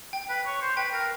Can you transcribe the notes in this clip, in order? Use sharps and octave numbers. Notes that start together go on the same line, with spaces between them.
G5
B4
C#5
C5
B4 G5
A#4